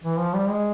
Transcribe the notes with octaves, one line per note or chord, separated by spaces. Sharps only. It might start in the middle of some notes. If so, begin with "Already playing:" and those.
E3
F3
G3
G#3